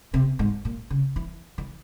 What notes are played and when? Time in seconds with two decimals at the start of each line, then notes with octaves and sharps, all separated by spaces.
0.14 C3
0.39 G#2
0.65 A#2
0.90 C#3
1.16 E3
1.58 E3